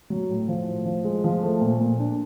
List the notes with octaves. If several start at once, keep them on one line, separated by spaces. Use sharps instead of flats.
F#3
A2
F3
A2
F3
G#3
F3
A3
A#2
A#2
D4